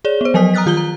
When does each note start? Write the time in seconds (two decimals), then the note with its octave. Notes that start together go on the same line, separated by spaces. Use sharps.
0.05 G#4 C#5 D5 G7
0.21 B3 C5
0.34 F3 F#3 D#5 G#5 D#6 B6
0.54 A#5 D#6 F6 F#6 A6 B6
0.66 D#3 F4 D#6 G6 G7
0.77 A#5